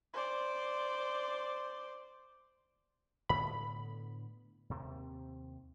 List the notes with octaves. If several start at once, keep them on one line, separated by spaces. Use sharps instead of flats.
C5 D5
A2 D3 B3 B5
D#2 C3 C4